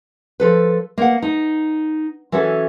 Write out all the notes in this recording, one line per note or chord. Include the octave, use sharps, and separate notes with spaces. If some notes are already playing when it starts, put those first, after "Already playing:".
F3 A4 B4
A#3 B3 F#5
D#4
E3 F#3 C#4 F#4 A4